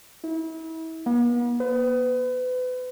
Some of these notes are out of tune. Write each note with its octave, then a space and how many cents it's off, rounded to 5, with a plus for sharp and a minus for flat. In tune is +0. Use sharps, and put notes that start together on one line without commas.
E4 -35
B3 -45
B4 +35